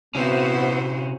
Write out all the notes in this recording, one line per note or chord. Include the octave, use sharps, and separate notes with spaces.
C3 B3 C#4 E4 F#4 C5